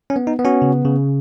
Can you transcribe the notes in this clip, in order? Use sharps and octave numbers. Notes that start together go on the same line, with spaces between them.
C#4
B3
D#4
B3
C#4 F#4
C#3
C#3